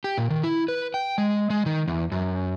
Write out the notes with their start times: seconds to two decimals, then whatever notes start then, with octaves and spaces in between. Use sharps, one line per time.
0.04 G4
0.18 A#2
0.30 D#3
0.44 E4
0.68 B4
0.94 G5
1.18 G#3
1.50 G#3
1.66 D#3
1.88 E2
2.12 F#2